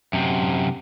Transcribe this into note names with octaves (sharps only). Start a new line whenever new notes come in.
F#2 C3